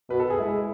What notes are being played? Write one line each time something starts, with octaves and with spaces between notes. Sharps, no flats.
B2 B4
A4
G#4
G#3 E4